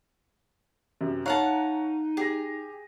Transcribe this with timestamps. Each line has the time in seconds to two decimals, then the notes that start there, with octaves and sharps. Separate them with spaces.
1.01 F#2 C3
1.26 D#4 C#5 F5 F#5 A5 A#5 F#6
2.17 G4 G#4 A#6